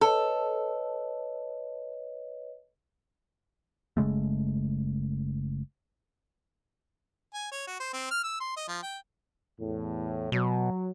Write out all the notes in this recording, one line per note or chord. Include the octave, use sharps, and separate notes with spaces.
A4 B4 C#5 D#5
F#1 C#3 G#3 A3
G#5
C#5
F#4
C5
C4
F6
E6
C6
D#5
F3
G5
E2 A2
B2 F#3